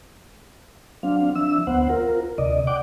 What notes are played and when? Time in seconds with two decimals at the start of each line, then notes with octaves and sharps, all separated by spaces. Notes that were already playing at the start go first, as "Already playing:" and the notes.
1.03 F#3 C4 D4 F5
1.36 F3 D4 E5 E6
1.67 D2 B3 C5 F#5
1.89 F4 A#4
2.38 D2 C3 D5 D#5
2.67 D5 F#5 G5 D6